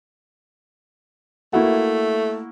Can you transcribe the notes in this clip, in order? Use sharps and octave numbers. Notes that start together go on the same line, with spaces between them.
A3 A#3 E4 F#4